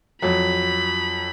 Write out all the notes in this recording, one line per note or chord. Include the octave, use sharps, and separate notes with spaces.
F2 F#3 B5